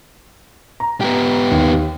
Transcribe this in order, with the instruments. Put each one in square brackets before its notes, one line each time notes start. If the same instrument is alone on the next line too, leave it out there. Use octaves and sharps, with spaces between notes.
[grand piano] A#5
[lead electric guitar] B3 G4
[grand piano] D#2